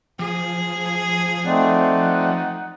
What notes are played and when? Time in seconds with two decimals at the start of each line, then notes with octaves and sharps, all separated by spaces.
0.19 F3 G#4
1.45 A3 C4 D#4 D5 F#5